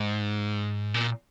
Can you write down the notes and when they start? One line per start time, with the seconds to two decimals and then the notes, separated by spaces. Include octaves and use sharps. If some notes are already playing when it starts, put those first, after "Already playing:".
Already playing: G#2
0.94 A#2